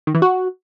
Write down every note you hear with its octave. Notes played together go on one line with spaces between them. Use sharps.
D#3
E3
F#4